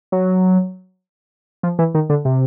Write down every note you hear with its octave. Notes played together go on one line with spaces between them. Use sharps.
F#3
F3
E3
D#3
D3
C3